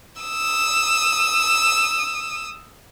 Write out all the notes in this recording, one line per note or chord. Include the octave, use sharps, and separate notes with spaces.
D#6 E6